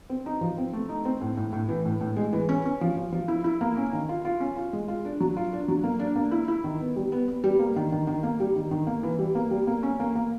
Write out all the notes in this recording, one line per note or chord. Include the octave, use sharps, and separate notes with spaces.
C4
D#4
F3
C4
A3
D#4
C4
A2
A2
A2
E3
A2
A2
G#3
E3
C#4
C#4
F3
F3
F3
E4
E4
A#3
C#4
D#3
F4
F4
C#4
F4
G#3
F4
D4
F#3
F4
D4
F#3
A#3
D4
A#3
E4
E4
D#3
B3
G3
B3
B3
G3
A#3
D#3
D#3
D#3
A#3
G3
D#3
D#3
A#3
E3
G3
A#3
G3
A#3
C#4
A#3
A#3